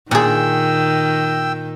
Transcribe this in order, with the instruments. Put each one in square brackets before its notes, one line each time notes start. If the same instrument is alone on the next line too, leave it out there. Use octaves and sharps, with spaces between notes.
[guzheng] A#2 G#4 [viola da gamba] D#3 [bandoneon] G5 E6